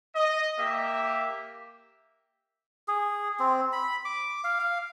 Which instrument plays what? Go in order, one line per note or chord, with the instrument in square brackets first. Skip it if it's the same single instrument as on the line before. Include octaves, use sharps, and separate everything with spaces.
[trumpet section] D#5
A#3 G4 E5
[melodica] G#4
C4
B5
D6
F5
F5